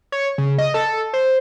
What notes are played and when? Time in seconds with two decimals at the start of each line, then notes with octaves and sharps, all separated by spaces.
0.12 C#5
0.38 C#3
0.58 D#5
0.74 A4
1.13 C5